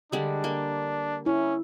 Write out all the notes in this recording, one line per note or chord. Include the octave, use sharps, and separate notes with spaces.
D3 G3 G#3 D4
A#3
C#4 E4